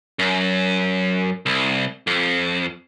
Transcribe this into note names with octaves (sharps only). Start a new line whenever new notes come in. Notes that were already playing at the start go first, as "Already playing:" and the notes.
F#2
C2
F2